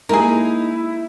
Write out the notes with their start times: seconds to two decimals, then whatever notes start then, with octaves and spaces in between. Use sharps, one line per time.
0.09 G#3 A#3 D#4 E4 G4 G#4 A#4